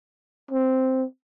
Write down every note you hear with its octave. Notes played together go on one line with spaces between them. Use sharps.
C4